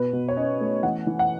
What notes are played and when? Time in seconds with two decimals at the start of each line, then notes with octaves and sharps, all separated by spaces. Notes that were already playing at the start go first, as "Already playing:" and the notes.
Already playing: B2 B4
0.13 B2
0.28 C#5
0.36 C#4 D#5
0.61 A3
0.83 E3 F#5
1.07 E3
1.19 F#5